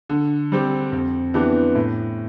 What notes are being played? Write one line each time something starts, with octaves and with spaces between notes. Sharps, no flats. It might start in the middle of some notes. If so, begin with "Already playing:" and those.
D3
G3 C4 G4
F2
E3 B3 D4 G4
A2